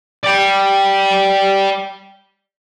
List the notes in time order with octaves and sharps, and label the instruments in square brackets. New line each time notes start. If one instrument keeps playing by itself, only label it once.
[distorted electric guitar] D5 G5